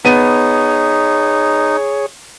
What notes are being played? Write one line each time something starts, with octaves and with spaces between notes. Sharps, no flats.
B3 D#4 G#4 C#5 D#7